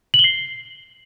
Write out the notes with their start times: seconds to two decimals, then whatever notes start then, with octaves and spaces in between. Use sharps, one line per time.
0.14 F#7
0.19 G7
0.24 C7